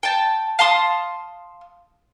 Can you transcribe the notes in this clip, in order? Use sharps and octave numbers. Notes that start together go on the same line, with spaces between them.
G5 A5
F5 A5 C6 D#6